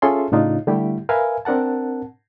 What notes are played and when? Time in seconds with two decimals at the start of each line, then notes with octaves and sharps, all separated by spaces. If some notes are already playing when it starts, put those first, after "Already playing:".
0.02 C#4 F4 G#4 A4 E5 C6
0.32 A2 C#3 D4 D#4 F4
0.67 D3 G3 A3 E4 G4
1.09 A#4 B4 E5 F5 G#5
1.45 C4 D4 A#4 F#5 A5